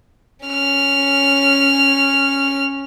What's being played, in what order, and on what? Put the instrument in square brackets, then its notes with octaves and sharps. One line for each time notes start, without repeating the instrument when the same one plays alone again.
[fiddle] C#4 F6